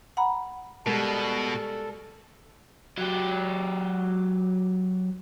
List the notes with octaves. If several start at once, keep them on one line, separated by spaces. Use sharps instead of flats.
F#5 A#5 B5
B2 G3 G#3 A4 A#4
F#3 G4